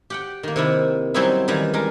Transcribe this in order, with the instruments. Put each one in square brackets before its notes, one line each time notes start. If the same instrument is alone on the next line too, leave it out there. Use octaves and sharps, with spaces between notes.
[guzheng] G4 F#5 G5
D#3 A#3
C3 D#3 E4
F#3 G3 C4 C#4 D#4 E4
D#3 E3 G3
G3 G#3 A#4